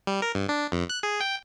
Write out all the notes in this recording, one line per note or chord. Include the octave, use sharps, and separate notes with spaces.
G3
A#4
G2
D4
F2
F#6
G#4
G5